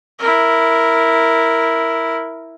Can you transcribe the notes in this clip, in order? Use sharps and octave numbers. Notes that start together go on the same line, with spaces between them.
E4 A#4